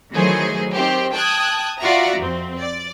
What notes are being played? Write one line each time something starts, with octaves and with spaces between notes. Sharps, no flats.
D#3 E3 F#3 A3 G#4 C5
D#3 C4 G4 C5
G5 A5 D#6 F#6 G#6
F4 F#4 D5 E5 F#5 A#5
F2 C4
D5